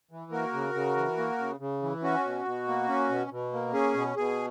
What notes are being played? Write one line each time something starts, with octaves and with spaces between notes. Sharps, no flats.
E3
A#3 F#4 A#4
C#3
C#3
E3
A#3
C#3
C#3
E3
C#4 F#4
B2
B2
A#3
C#4
B2
B2
A#3
C#4 G#4
B2
B2 G#4